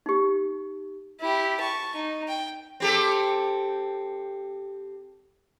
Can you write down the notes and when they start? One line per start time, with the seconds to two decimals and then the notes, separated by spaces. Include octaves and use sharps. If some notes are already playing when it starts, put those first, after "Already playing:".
0.06 D#4 G4
1.20 E4 G4
1.61 A5 C#6
1.95 D#4
2.28 G5
2.80 C4 G4 A4